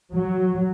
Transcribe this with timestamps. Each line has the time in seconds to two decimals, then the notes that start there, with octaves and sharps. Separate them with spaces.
0.13 F#3